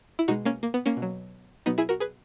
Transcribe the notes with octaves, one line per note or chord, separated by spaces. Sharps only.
E4
B2 G#3 D#4 F#4
A#3 C#4
A#3
B3
A#3 C#4
B2
F#3
B2 F#3 B3 D#4
E4 G#4
F#4 A#4
G#4 B4